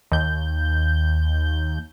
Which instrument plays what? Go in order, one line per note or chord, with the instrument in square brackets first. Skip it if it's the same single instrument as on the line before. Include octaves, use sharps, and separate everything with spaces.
[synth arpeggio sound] D#2 G6